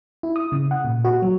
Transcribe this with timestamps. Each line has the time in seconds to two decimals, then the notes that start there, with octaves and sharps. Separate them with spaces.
0.23 E4
0.36 D#6
0.52 C#3
0.71 F#5
0.85 A#2
1.05 F#4
1.22 F#3